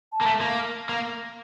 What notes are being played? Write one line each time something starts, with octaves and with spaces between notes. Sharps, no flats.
A5
A#3
A3
A#3
A#3